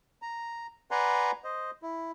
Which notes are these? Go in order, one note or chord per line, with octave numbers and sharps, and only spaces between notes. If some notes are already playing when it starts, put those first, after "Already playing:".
A#5
B4 D5 F#5 G#5 A#5 C6
C5 D#5
E4